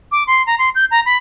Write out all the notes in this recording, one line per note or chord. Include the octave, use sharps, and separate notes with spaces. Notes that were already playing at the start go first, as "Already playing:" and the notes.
D6
C6
A#5
C6
G6
A#5
B5